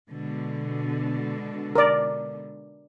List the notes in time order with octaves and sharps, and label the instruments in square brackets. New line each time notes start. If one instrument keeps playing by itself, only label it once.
[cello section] B2 D3 G#3
[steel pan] A#4 D5